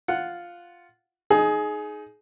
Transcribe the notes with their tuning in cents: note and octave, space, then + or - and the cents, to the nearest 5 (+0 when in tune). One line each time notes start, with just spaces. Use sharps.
F4 +0 F#5 +0
D#4 +0 G#4 +20